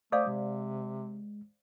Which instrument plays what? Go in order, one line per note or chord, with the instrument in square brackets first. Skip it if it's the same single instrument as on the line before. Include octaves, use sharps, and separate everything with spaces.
[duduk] A3 [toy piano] C5 D5 F5 [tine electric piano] D6 D#6 G6
[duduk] C3 [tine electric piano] G#3